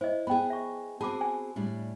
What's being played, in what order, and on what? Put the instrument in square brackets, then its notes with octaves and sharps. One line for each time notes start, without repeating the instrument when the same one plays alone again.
[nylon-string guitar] E4 [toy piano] C5 D#5
[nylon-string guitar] B3 G#4 [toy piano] G5 B5
[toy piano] E5 C#6
[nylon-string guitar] C4 F#4 G#4 [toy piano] A5 B5 D6
[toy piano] G#5
[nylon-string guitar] A2 G3 D4